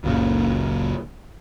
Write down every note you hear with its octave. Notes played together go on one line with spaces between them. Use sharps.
F#1 C#2 A#2 C#3